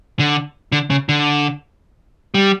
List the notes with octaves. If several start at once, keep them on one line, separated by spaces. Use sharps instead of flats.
D3
D3
C#3
D3
G3